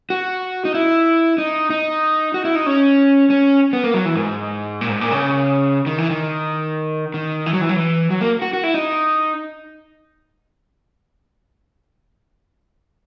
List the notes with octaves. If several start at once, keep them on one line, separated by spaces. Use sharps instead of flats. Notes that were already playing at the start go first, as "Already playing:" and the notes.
F#4
D#4
E4
D#4
D#4
F#4
E4
D#4
C#4
C#4
B3
A#3
F#3
E3
G#2
A#2
G#2
A#2
C#3
D#3
E3
D#3
D#3
E3
F#3
E3
F#3
E3
F#3
A#3
F#4
F#4
E4
D#4